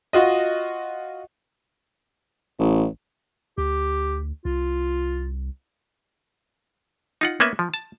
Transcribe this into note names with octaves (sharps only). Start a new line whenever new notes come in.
F4 F#4 D#5
A1
D2 G4
C2 F4
D#4 F4 F#5
A#3 B3 C#4 B4 E5
F3
A5